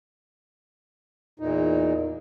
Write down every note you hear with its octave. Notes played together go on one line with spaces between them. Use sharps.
E2 A#2 D#4